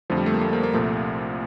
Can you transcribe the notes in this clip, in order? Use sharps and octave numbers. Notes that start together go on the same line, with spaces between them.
F2 D3 F3 A3
G3
A3
A#3
A3
A#3
A#3
C2 A#2 F3 A3